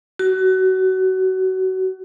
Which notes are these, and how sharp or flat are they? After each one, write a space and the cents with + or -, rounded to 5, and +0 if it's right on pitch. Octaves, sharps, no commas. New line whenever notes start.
F#4 +25